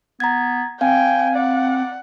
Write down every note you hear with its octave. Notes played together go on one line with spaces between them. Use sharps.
B3 A#5 G#6
C4 F5 G5 G#5
D5 F#5